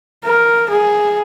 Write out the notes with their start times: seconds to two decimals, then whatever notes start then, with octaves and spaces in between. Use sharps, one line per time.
0.25 A#4
0.70 G#4